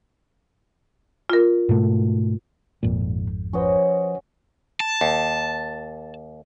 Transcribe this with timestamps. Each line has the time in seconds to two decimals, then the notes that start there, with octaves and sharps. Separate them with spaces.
1.30 F4 A#4
1.69 G#2 B2 A3
2.83 G#1 F2 A#2
3.53 F3 C#4 F#4 B4 C5 D#5
4.80 A5
5.01 D#2